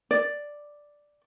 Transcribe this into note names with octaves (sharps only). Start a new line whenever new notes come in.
D5